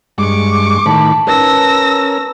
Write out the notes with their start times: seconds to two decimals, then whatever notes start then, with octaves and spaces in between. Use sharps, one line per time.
0.18 G2 G#3 C#6 D6
0.86 A2 D#3 A5 B5
1.27 C#4 A#4 B4 A5 E6 A#6